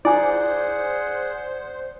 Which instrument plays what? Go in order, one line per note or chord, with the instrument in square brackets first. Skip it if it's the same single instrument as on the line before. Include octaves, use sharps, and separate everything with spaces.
[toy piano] E4 G#5 D6 [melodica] G#4 F#5 [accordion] C5 [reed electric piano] D5